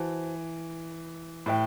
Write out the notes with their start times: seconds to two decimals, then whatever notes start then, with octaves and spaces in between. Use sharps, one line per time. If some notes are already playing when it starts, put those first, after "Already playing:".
Already playing: E3 F#4 C5 A5
1.46 A2 G4 B4 E5 G5